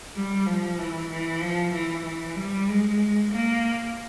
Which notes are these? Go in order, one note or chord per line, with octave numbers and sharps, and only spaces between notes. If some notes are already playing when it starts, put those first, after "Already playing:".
G3
F3
E3
E3
F3
E3
E3
G3
G#3
A#3